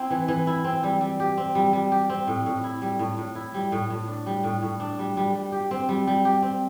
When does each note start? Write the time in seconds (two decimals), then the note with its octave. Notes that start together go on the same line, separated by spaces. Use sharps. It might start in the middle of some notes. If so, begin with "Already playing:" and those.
Already playing: C4 E4
0.10 E3
0.28 E3
0.47 E4
0.64 C4
0.83 G3
1.01 G3
1.20 G4
1.37 C4
1.55 G3
1.73 G3
1.92 G4
2.09 C4
2.27 A2
2.46 A2
2.64 E4
2.82 G3
2.99 A2
3.18 A2
3.35 E4
3.54 G3
3.72 A2
3.90 A2
4.08 D4
4.26 G3
4.44 A2
4.62 A2
4.80 D4
4.99 G3
5.17 G3
5.35 G3
5.52 G4
5.71 C4
5.89 G3
6.07 G3
6.25 G4
6.42 C4